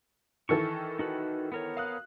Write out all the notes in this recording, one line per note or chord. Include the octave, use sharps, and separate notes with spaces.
D#3 E3 A4 C#6
D#4 F#4 B4
B3 A#4 C#5
F5 D#6 F#6